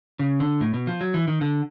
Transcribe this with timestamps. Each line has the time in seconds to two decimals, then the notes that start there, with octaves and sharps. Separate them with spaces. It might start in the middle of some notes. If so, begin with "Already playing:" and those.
0.19 C#3
0.40 D3
0.61 A2
0.74 B2
0.87 F3
1.01 F#3
1.14 E3
1.28 D#3
1.41 D3